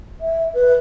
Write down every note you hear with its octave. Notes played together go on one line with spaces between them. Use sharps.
E5
B4